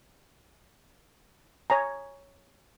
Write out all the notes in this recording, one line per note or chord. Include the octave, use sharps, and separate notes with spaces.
C#5 G#5 A#5